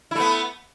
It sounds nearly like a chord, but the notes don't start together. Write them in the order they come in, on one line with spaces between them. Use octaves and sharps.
E4 A3 B3